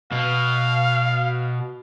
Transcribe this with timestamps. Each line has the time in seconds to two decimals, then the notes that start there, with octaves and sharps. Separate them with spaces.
0.12 B2 F5